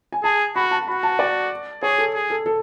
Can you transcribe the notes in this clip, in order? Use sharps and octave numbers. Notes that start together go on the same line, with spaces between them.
G#5
G#4 A5
F#4 B5
A5
F#4 B5
A5
D5
G#4 C#5
A4
G#4
A4
A4